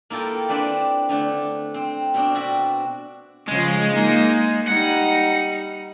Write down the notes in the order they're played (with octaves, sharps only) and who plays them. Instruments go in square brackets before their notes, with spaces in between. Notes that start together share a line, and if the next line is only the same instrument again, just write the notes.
[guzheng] A#3 E4 F4 A4 G5
C4 D4 B4 D5
D3 A3 D4
C4
B2 C4 D4
F#4 D5 E5
[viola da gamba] C#3 F3 [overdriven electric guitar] G#3
[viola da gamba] A#3 D#4
[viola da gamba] G3 D#4 [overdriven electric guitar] F#5